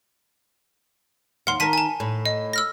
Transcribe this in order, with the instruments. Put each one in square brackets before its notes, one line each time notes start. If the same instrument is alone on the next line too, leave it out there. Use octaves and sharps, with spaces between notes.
[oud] D#2 F5 [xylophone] F#5 C6
[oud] D#3 A#4 [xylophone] A5 B6 D#7
[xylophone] G#5 A5
[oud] A2
[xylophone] D#5
E6 F6 A#6